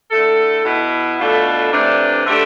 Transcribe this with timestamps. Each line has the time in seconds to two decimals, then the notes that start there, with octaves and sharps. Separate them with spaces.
0.11 D3 A3 E4 A4
0.64 B2 B3 E4
1.19 B2 A3 D4 F4 A4
1.72 C3 E3 A3 D4
2.26 D3 A3 D4 G4